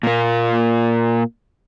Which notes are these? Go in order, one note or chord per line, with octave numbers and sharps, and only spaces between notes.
A#2 A#3